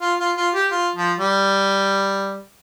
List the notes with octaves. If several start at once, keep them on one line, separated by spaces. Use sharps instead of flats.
F4
F4
F4
G4
F4
F3
G3